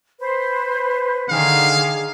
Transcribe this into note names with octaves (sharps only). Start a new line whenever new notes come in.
B4 C5
D3 D#3 G#4 F5